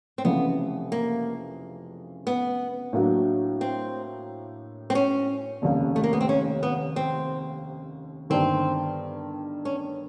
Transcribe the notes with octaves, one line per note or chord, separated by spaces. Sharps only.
C4
F1 F2 C#3 E3 A3 B3
A#3
B3
A2 F#3 A#3 D4 F#4
C4
C4
C#4
F1 D#2 C#3
A3
A#3
B3
C4
C#4
B3
C4
G1 G2 D#3 C4
C#4